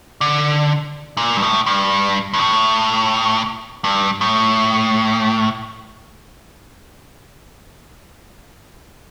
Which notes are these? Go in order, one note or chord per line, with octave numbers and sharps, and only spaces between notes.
D3
A#2
G2
A2
G2
G2
A2
G2
A2